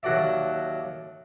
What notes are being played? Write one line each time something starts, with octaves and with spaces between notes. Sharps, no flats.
D#2 F#3 F#4 A4 D5 E5